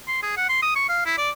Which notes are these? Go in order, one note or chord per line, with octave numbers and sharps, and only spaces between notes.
C6
G#4
F#5
C6
D#6
C#6
F5
E4
D5